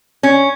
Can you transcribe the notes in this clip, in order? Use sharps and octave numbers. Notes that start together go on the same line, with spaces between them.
C#4